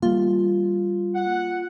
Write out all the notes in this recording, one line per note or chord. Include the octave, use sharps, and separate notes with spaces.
G3 A#3 F4
F#5